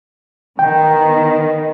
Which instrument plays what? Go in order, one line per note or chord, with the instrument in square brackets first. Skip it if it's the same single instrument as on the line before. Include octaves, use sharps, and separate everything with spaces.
[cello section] D#3 B3 [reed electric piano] G5